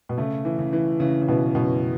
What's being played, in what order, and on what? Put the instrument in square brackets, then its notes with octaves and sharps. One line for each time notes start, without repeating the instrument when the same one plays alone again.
[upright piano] B2
[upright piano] C#3 [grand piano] A3
[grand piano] E3
[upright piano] C#3
[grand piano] E3
[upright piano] C#3 [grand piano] E3
[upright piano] C#3
[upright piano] B2 [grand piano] E3
[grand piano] F#2 [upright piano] B2